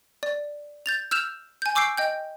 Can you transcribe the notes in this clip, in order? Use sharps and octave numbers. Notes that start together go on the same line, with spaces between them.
D5
G6 A6 F7
E6 F6 G6 E7 F7
G#5 G6
C#6 D6 E6 G6 C7 D7
D#5 G5 G6